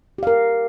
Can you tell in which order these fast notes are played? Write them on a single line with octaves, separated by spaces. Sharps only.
G4 F5 A#4